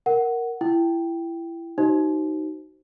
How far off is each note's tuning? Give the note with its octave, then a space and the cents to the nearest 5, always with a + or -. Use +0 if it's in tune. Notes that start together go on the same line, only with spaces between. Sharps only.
A#4 +0 F#5 +10
E4 +25 G5 +0
D#4 +0 F#4 +40 C5 +0